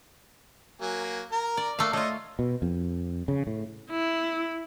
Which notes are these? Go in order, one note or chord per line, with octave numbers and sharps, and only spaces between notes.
F#3 A#3 G#5
A#4 A#5
D5
A3 A#3 F5
A3 F4 C#5 D#5
B2
F2
C#3
A2
E4